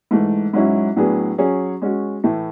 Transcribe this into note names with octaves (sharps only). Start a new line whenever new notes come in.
G#2 E3 A3
G#2 F#3 C#4 E4
A2 F#3 B3 D4 G#4
F#3 C#4 G#4 C#5
G#3 C#4 F#4
A2 E3 A3 E4